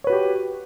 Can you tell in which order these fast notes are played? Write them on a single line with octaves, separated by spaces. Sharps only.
C#5 B4 F#4 G4